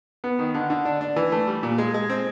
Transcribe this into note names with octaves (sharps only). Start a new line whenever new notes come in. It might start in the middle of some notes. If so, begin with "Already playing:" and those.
B3
D#3
D3
D3
D4
D4
E3
A3
G3
A#2
G#3
G#3
C4